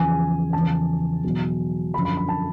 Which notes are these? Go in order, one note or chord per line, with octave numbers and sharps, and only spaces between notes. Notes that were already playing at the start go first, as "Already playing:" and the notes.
Already playing: E2 C#3 F3 G#5
E2 C#3 F3 A5
E2 B2 F#3
F#2 D3 F3 B5
B5
B5
A5